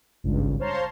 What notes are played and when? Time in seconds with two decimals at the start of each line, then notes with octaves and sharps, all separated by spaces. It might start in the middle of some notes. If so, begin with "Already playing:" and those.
0.24 G#1 C#2 G2
0.60 C5 C#5 F5 A5 A#5 C6